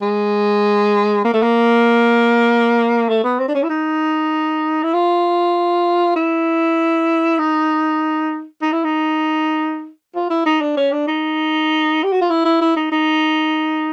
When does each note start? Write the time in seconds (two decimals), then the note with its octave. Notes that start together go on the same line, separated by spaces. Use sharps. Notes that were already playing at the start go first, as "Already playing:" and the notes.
0.02 G#3
1.25 A#3
1.34 A3
1.43 A#3
3.09 A3
3.24 B3
3.40 C4
3.48 D4
3.55 C#4
3.63 E4
3.70 D#4
4.83 E4
4.94 F4
6.16 E4
7.39 D#4
8.62 D#4
8.73 E4
8.84 D#4
10.15 F4
10.30 E4
10.46 D#4
10.61 D4
10.77 C#4
10.92 D4
11.07 D#4
12.03 G4
12.12 F#4
12.22 F4
12.30 E4
12.45 E4
12.61 E4
12.76 D#4
12.92 D#4